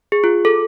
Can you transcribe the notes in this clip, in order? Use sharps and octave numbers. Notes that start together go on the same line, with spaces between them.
G#4
F4
A4